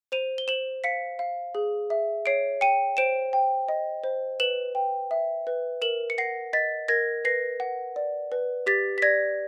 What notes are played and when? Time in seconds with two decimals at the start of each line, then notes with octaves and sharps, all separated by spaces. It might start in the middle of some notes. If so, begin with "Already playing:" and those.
0.12 C5 D#7 F7
0.38 G7
0.48 C5 E7 F#7
0.84 F5 B6 C#7
1.19 F5
1.55 G#4
1.90 E5
2.26 C#5 C7 D7
2.61 G5 C#7 D#7
2.97 C5 D7 E7
3.33 G5
3.69 D#5
4.04 C5
4.40 B4 E7 F#7
4.75 G5
5.11 E5
5.47 B4
5.82 A#4 E7 F#7
6.10 C#7
6.18 F#5 A#6 C7
6.53 D#5 A6 B6
6.88 A#4 G#6 A#6
7.25 B4 A#6 C7
7.60 F#5
7.96 D5
8.32 B4
8.66 G4 A6 B6
8.98 B6
9.02 D5 G#6 A#6